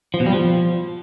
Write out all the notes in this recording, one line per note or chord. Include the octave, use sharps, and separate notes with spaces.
F3
B2
G3
F3